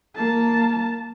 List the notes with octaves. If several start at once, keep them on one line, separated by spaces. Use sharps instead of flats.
A#3 A5